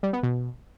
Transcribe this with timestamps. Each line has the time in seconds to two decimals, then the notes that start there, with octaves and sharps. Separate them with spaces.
0.03 G3
0.13 B3
0.23 B2